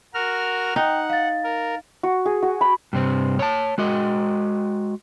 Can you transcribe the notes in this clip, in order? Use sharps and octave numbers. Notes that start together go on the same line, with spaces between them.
F#4 A#4 F6
D#4 F#5 G5
F5 A6
A#4
F#4
G#4
F#4
B5
G2 C3 C4
C#5 A5
G#3 F#4 D#5